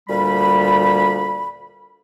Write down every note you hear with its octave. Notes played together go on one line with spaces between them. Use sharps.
D2 A#2 G3 B5